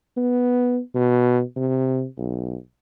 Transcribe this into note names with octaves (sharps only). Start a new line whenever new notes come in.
B3
B2
C3
B1